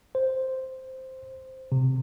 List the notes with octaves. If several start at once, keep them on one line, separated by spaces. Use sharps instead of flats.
C5
C3